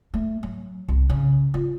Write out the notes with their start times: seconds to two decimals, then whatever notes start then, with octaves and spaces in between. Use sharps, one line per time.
0.14 A3
0.43 F#3
0.89 C2
1.10 C#3
1.54 F4